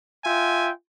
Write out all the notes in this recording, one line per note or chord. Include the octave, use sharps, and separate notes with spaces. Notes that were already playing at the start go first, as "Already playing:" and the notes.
F4 E5 G5 G#5